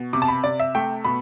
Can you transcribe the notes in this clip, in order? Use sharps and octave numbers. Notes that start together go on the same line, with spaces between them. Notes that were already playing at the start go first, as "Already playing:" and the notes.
Already playing: B2
C3 D6
A5
B5
C3 D5
E5
A3 G5
B2 B5